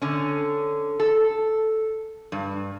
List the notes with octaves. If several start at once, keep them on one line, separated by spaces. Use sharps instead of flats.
D3 C#4
A4
G2